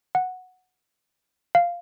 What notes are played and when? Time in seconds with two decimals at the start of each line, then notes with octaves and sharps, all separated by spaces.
0.15 F#5
1.55 F5